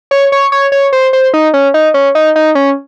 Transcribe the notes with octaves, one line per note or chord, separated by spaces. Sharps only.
C#5
C#5
C#5
C#5
C5
C5
D#4
C#4
D#4
C#4
D#4
D#4
C#4